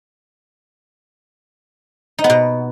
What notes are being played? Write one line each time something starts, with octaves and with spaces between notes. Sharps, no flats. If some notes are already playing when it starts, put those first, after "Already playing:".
D#4
B3
B2